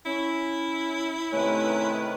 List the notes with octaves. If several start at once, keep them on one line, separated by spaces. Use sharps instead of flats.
C#4 E4
C3 D#3 A3 C#4 B4